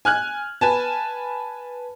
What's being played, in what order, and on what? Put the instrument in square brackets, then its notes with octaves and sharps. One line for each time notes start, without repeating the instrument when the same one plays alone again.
[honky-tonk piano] G#5 F6 F#6 G#6
B4 G#5 A5